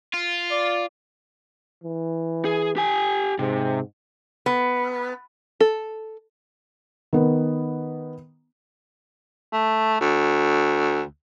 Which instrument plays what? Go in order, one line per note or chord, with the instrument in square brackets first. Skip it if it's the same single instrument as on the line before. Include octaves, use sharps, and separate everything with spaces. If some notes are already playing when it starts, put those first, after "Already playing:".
[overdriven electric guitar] F4
[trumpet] D5
[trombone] E3
[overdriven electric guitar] G#4
G4 G#5
[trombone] G#2 [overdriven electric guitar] C3
[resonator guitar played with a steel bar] B3
[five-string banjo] A4
[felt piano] D#3 B3
[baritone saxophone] A3
D2